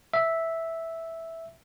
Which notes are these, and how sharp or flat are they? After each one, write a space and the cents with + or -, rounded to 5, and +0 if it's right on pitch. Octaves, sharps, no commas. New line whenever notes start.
E5 -5